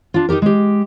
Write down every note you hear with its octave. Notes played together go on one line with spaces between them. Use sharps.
D4 F4
D#4 F#4 G4 A#4
G#3 G4